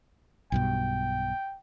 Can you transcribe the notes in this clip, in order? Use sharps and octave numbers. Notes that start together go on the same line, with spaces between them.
B1 G2 B2 G5